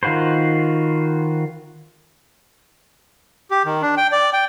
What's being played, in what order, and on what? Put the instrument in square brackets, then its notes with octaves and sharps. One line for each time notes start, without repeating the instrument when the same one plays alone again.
[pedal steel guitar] D#3 F4 F#4 B4 C5
[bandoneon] G4
D#3
D4
G5
D5
G5